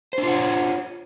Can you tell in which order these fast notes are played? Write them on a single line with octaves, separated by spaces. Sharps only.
C5 D4 F4 F#5 C#5